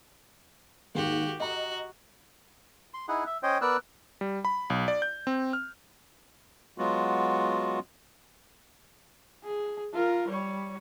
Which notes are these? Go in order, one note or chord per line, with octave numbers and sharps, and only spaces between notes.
D#2 G#2 D#3 F#4 G4
F#4 D#5 A#5
C6
D#4 E4 G#4 F#5
E5
C#4 C5 C#5 D#5 G5
B3 A#4 B4 D5 E6 F#6
G3
B5
B1
D5
G6
C4
F6
F#3 G#3 B3 F4 F#4
G#4
F4 A#4
G3 C#5